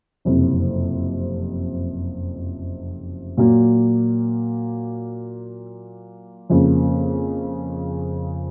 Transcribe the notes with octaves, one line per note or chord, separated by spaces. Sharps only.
F#1 F2 C3
A#2 F#3 A#3
F2 C#3 F3 A#3